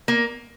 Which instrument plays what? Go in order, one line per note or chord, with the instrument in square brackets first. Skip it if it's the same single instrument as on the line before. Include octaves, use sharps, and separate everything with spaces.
[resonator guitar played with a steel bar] A#3